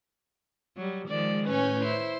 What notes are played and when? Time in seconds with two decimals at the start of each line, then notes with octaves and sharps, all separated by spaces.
0.77 F#3 G3
1.09 D#3 F3 G#3 D5
1.46 A2 C#4 B4 C#5 G#5 G6
1.85 E4 C5 C6